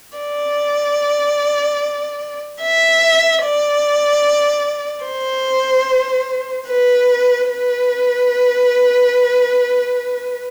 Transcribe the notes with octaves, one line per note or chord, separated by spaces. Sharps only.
D5
E5
D5
C5
B4
B4